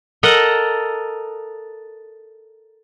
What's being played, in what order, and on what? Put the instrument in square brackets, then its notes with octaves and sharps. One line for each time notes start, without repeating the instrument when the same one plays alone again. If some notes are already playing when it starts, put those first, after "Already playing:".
[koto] A4 A#4 D#5 F#5